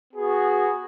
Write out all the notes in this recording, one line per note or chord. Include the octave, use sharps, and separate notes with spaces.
B3 F#4 G#4